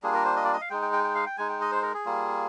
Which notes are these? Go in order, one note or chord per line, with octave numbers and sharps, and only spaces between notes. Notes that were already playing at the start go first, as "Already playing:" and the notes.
G3 A#3 D4 F4 G#4
A#4
C5
D#5
D5
D#5
F5
G#3 D#4 G5
G5
G5
G5
F5
G5
G#3 D#4 G#5
G5
D#5
C5
A#4
G#4
G3 A#3 F4